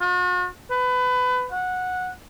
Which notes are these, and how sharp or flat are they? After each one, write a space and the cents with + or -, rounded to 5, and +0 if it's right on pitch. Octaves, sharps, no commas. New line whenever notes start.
F#4 -45
B4 +25
F#5 -15